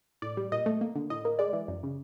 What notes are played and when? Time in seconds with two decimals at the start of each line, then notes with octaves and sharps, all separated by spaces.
0.22 A2 D5
0.37 G3
0.52 A#2 D#5
0.66 A3
0.81 A#3
0.96 D3
1.10 A2 D#5
1.25 A#3
1.39 G#3 D5
1.53 E3
1.68 F#2
1.83 C#3